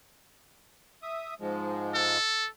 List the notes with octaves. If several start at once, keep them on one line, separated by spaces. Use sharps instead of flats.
E5 D#6
G#2 F3 G#3
A4